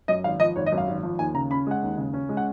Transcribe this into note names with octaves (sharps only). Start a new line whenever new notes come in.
F#2 D#5
G#1 F5
F3 D#5
G#1 C#5
D#5
F#2
F5
G#1
F3
D#2 G#5
C#3 A#5
C#4 B5
G#3 F#5
D#2
C#3
C#4
G#3
F#5